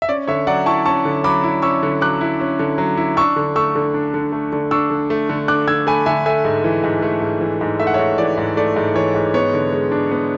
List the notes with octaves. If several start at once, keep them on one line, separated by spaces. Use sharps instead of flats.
E5
C#4 D5
D3 C#5 E5
F#3 D5 F#5
E4 A5 C#6
C#4 A5 C#6
D3
F#3 B5 D6
E4
C#4 C#6 E6
D3
F#3 D6 F#6
E4
C#4
D3
F#3
E4
D4 C#6 E6
D3
A3 C#6 E6
D3
D4
D3
A3
D3
D4 C#6 E6
D3
A3
D3
D4 D6 F#6
D3 E6 G#6
A3 G#5 B5
D3 E5 G#5
A3 E5 G#5
G#2
E3
G#2
A3
G#2
E3
G#2
A3 E5
F#5
C#5 E5
G#2
E3 D5
G#2
A3 D5
G#2
E3 C#5
G#2
B3 C#5
D3
G#3
D4
B3